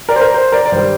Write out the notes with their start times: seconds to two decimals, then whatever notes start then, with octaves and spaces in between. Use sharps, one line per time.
0.09 A#4 D5
0.16 C5
0.21 A#4
0.34 C5
0.52 A#4 D5
0.66 D5
0.72 G2 D#3 G3 C5